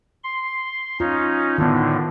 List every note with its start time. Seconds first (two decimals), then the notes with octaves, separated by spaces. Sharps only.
0.24 C6
1.00 C#4 D#4 F4
1.58 A2 D3 D#3 B3